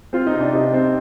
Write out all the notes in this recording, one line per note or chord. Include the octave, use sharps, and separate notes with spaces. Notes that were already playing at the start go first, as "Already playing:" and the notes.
C4 F4
D#4
C3
D4
C3 D#4
C4